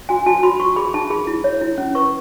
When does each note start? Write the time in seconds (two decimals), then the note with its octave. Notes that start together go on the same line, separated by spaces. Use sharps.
0.09 F#4 G#5
0.26 F#4 A5
0.43 F#4 B5
0.60 F#4 C#6
0.76 G#4 B5
0.94 D#4 A5
1.10 G#4 B5
1.27 E4
1.44 C#5
1.61 E4
1.78 C#4
1.95 B4 C#6